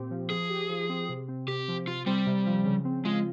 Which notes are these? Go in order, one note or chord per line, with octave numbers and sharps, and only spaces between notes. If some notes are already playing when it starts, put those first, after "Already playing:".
Already playing: A#2 C4 G4
F3
F3 G#4
G4
F3
C4
C3
C4
C3 G4
F3
C3 F4
G3 C4
C3
F3
C#3
C4
G#3 F4